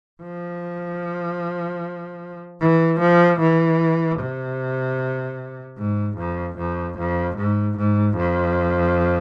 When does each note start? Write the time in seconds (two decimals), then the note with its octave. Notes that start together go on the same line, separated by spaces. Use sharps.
0.22 F3
2.61 E3
3.00 F3
3.40 E3
4.20 C3
5.78 G#2
6.18 F2
6.58 F2
6.98 F2
7.37 G#2
7.77 G#2
8.17 F2